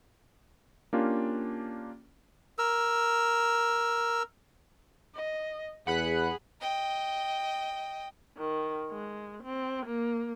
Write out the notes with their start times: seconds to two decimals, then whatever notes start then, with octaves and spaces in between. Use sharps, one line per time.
0.93 A#3 C#4 D4 F4 G4
2.58 A#4 E6
5.15 D#5
5.87 E2 G#4 F#5 B5 F#6
6.61 D#5 G5
8.37 D#3
8.91 G#3
9.43 C4
9.86 A#3